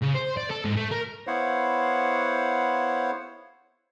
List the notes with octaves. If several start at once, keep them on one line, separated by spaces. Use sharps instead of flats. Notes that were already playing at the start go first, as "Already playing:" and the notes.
C#3
C5
D5
A4
G#2
A3
A#4
B3 E4 C5 C#5 F5 F#5